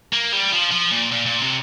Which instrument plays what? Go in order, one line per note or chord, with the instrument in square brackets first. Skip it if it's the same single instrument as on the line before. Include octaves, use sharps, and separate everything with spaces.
[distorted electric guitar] A#3
G3
F3
F3
A#2
A#2
A#2
C3